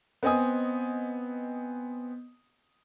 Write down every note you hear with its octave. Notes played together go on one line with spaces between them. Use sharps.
B3 C4 D#5 G#5 D#6